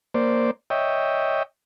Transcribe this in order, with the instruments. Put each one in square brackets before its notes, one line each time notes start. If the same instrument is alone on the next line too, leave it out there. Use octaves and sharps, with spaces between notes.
[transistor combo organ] A#3 C5 D5
C#5 D#5 E5 G5